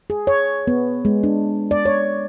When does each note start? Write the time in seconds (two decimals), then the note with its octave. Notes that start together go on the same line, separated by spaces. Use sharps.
0.10 G#4
0.27 C#5
0.67 B3
1.05 G#3
1.23 D4
1.71 D5
1.85 C#5